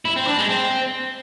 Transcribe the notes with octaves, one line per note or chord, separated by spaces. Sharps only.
E4
C4
D4
G#3
C4